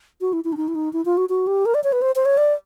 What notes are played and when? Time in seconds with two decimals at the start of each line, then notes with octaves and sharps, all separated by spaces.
0.21 F#4
0.33 E4
0.44 E4
0.52 D4
0.57 D#4
0.68 E4
0.75 D#4
0.93 E4
1.05 F4
1.17 F#4
1.29 F#4
1.47 G4
1.65 A#4
1.74 D5
1.84 C#5
1.92 B4
2.02 C5
2.15 C5
2.25 C#5
2.37 D5